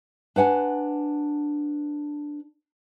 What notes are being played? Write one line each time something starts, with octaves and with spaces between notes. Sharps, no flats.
D4 B4 F#5 G#5